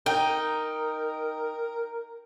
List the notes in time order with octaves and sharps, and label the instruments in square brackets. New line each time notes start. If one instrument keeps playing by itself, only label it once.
[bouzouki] D#4 [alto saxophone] A#4 [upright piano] G5